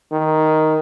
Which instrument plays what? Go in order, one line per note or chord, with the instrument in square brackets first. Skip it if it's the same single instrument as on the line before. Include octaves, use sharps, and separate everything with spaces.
[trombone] D#3